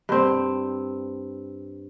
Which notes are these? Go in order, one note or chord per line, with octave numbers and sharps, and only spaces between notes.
G2 C4